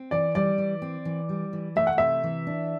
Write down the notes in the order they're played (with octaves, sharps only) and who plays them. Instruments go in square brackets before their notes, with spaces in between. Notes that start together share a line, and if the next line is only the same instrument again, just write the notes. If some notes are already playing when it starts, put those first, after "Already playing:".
Already playing: [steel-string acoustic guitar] C4
[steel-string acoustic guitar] E3 [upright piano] D5
[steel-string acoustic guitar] G3 [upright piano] D5
[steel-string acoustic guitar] E3
C4
E3
G3
E3
[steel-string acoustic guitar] A3 [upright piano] E5
[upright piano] F#5
[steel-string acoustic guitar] C3 [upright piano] E5
[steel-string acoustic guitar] E3
D4